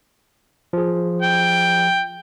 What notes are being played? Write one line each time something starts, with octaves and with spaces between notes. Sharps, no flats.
F3 G#4
G5